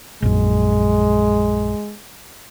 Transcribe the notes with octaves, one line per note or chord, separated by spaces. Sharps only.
A#1 F#2 G#3